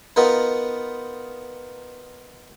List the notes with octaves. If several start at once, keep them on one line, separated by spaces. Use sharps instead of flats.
B3 D#4 F4 A#4 B4